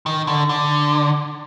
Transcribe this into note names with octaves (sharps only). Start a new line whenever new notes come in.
D#3
D3
D3